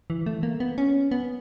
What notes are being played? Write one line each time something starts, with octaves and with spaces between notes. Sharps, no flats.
E3
A3
A#3
B3
C#4
B3